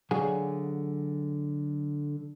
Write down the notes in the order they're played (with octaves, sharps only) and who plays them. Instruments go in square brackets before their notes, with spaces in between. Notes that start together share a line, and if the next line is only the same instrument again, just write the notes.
[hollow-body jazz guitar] D3 F#3 G#4 F5 G#5